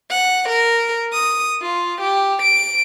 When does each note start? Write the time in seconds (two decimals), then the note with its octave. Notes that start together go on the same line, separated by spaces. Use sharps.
0.11 F#5
0.49 A#4
1.13 D#6
1.62 F4
2.01 G4
2.42 D7